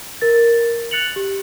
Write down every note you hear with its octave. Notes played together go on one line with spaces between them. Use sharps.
A#4 A6
F#6 A6 C#7 F7 F#7
G4